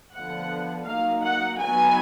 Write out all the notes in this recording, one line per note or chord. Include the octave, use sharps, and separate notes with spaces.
D3 F3 B3 F#5
F#3 A#3 D#4 F5
F#5
F#3 B3 D#4 G#5